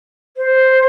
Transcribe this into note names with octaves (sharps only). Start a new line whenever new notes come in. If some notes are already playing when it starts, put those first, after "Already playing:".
C5